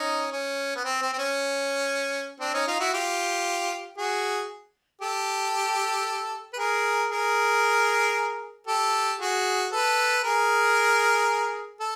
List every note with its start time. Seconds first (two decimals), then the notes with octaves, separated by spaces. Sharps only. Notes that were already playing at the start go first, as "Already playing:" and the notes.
Already playing: C#4 D#4
0.32 C#4
0.76 B3
0.84 C4
1.02 C4
1.13 C4
1.18 C#4
2.40 C4 D4
2.53 C#4 D#4
2.67 D#4 F4
2.79 E4 F#4
2.93 F4 G4
3.97 F#4 G#4
5.01 G4 A4
6.53 B4
6.58 G#4 A#4
7.10 G#4 A#4
8.67 G4 A4
9.19 F#4 G#4
9.72 A4 B4
10.23 G#4 A#4
11.80 A4